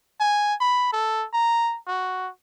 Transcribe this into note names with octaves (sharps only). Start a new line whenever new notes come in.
G#5
B5
A4
A#5
F#4